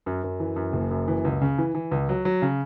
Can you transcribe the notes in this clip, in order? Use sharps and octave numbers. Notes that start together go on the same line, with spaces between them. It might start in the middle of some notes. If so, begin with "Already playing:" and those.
F#2
F#2
E3
F#2
F#1
F#2
E3
C#2
C#3
E3
E3
C#2
F#3
F#3
C#3